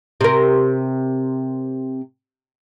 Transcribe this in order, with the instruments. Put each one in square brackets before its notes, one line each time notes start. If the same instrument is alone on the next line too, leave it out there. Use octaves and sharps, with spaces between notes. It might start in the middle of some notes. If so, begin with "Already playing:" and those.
[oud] C3 A#4